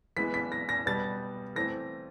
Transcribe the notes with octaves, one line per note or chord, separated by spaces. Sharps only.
E3 G#3 B3 B6
B6
A#6
A#6
B2 G3 B3 A6
E3 A3 C4 A#6